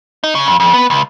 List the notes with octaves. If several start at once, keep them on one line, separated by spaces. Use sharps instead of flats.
D#4
C#3
F2
F2
B3
C#2